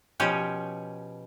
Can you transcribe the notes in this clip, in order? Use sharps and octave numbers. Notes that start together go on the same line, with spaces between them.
B2 F3 C#4 G4